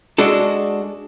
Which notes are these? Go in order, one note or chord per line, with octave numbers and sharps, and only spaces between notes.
G#3 D4 F#4 A4